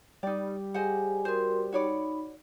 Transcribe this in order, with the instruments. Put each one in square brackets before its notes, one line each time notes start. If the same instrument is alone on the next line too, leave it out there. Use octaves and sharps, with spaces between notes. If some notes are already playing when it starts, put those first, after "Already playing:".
[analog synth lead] G3 [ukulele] D#4 D5
[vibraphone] G4 G#4 G#5 [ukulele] C5 D#5 F#5
[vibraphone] F#4 A#4 C6 [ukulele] G#4 C5
[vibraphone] D#4 B5 [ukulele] F#4 C#5 D5